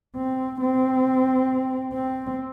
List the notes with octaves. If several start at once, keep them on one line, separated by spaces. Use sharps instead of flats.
C4
C4
C4